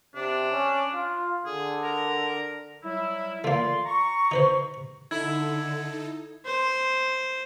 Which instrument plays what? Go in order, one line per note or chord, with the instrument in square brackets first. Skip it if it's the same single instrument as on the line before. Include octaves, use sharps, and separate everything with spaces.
[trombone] C3 [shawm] D4
[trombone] C#4
F4
[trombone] D3 [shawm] G#4
[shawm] A#4
[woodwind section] F#3 G3 E4
[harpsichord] A3 A#3 [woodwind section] F4 D5 C6
[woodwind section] A#5 C#6
[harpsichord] D#4 B4 C5
[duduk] D3 [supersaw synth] D#4 A4 [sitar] E4 [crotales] G#6
[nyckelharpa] C5